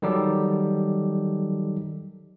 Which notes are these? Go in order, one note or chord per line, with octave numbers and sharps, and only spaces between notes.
D#3 F#3 G3 D#4 G4 A4